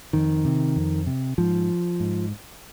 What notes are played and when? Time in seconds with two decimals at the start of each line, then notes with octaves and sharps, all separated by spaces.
0.13 F2 D#3
0.45 C3
0.76 F2
1.07 C3
1.38 G#2 F3
2.00 G#2